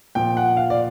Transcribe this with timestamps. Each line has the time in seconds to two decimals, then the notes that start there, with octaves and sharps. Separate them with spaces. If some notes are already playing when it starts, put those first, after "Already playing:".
0.15 A#2 F3 G5
0.37 F#5
0.57 F5
0.70 D5